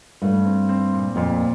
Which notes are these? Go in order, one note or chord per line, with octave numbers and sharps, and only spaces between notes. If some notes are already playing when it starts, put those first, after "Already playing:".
G2 A3
C4
C4
A#2
F2 A#2